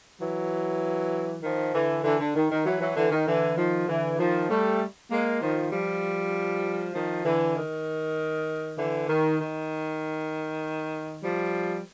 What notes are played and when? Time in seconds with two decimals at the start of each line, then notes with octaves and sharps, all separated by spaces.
0.21 E3 F#3
1.42 D#3 F3
1.74 D3 E3
2.04 D3 E3
2.20 D3
2.35 D#3
2.50 D#3
2.66 E3 F#3
2.80 E3 F#3
2.96 D3 E3
3.11 D#3
3.26 D3 E3
3.57 D#3 F3
3.88 D3 E3
4.18 D#3 F3
4.49 G3 A3
5.10 G#3 A#3
5.41 D#3 F3
5.71 F3 G3
6.94 D#3 F3
7.25 D3 E3
7.56 D#3
8.78 D3 E3
9.09 D#3
9.40 D#3
11.23 F3 G3